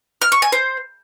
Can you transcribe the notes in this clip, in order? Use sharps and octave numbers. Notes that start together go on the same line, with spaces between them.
F6
C#6
G#5
C5